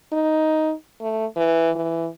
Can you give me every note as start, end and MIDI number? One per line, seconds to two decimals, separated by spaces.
0.12 0.73 63
1.01 1.26 57
1.37 1.70 52
1.76 2.08 52